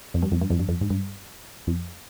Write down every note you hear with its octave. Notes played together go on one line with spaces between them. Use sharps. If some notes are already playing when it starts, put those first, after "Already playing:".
F2
G2
F2
G2
F2
G2
F2
G#2
G2
F2